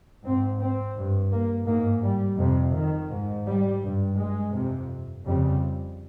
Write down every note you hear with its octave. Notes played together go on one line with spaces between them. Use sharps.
G#2 C4
C4
G2
A#3
G#2 A#3
G3
F2 C3
D#3
G#2
G3
G2
G#3
F2 C3
F2 C#3 G3